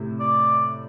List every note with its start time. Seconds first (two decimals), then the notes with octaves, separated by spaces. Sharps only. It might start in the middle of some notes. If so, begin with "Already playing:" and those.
Already playing: A2 C3
0.20 D5